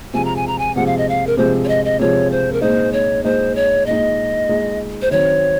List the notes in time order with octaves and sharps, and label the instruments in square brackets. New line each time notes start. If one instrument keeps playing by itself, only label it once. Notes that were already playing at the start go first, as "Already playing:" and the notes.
[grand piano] C3 F3 G#3 [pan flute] G#5
[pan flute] A#5
G#5
A#5
G#5
[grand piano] C3 F3 G#3 [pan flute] F#5
[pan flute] F5
D#5
F5
A#4
[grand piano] C3 F3 G#3 [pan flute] C5
[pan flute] C#5
D#5
D#5
[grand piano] C3 F3 G#3 [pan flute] C#5
[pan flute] C5
A#4
[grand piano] A#2 G#3 D#4 [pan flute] C5
[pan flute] C#5
[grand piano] A#2 G#3 D#4 [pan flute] C5
[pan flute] C#5
[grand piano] A#2 G#3 D#4 [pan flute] D#5
[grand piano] A#2 G#3 D#4
[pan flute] C5
[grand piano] D#3 F#3 C4 [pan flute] C#5